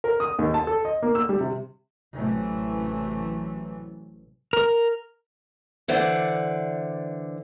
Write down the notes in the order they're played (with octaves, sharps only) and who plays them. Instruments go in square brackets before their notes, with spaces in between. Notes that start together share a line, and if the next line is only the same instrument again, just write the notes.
[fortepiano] A#4
D#6
D#2
A5
A4
D#5
A#3
E6
G3
C3
[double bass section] A1 A2 C3 E3 F#3 A3
[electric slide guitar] A#4
[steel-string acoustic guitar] D3 E3 C5 D5 F#5